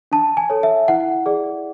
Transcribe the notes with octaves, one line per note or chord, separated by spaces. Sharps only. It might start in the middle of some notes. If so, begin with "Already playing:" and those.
D4 A5
G#5
A4 C#5
E5
E4 F#5
G#4 D5